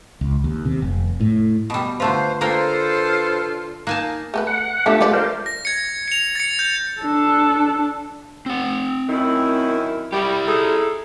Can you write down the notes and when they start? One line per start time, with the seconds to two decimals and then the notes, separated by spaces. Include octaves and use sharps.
0.21 C#2
0.44 D#2
0.65 C3
0.82 F1
1.20 A2
1.70 B2 G3
2.00 D3 A3 F4 B4 C5
2.41 A#3 D4 F4 A4 A#4 C5 G5
3.87 A#3 D#4 G#5 A5
4.34 A3 A4 B4
4.47 F#5
4.86 A3 D4 F4 G4 A4
5.01 D3 F3 G#3 D5
5.13 A#4 C5
5.46 A#6
5.65 G#6 C#7
6.08 C#7 F7
6.35 A6 C#7
6.59 G6
7.01 D4 A4
8.46 C4 F#5
9.09 F#2 D#3 E4
10.13 G3 E4 G4
10.47 D#4 G#4 A4